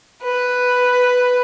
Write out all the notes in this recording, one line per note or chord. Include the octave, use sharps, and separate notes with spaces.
B4